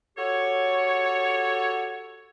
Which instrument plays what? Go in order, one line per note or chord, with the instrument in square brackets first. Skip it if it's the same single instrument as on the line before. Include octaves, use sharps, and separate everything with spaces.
[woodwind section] F#4 G4 A4 C#5